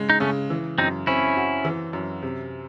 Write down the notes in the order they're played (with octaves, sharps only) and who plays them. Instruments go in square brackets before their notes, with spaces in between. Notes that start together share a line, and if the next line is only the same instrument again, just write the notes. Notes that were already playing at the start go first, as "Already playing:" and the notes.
Already playing: [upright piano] C#3 G#3
[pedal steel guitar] D#4
[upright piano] C#3 [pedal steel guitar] A3 C#4
[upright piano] E3
[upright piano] F#2 [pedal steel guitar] C4 D#4
[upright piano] C4 [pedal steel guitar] C#4 E4
[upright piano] F#4
E3
F#2
C3